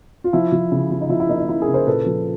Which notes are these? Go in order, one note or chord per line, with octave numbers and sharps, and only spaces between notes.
F4
F3 E4
F3
C#3
F3
D#4
F3 E4
E4
A#3 D#4
D#4
F3 E4
G#4 A#4
C#3
A#4 C5
A#2 A4 B4
F3